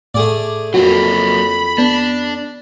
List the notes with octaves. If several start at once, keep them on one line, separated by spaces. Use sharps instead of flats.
A2 A3 G#4 D5
F2 F#3 A#3 F#4 B5
B3 D4